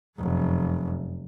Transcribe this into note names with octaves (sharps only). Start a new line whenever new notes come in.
F1 F#2